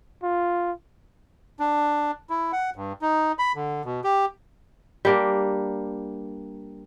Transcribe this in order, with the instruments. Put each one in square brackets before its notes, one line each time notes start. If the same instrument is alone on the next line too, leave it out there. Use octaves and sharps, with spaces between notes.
[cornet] F4
[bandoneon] D4
E4
F#5
G2
D#4
B5
D3
B2
G4
[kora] G3 A#3 D4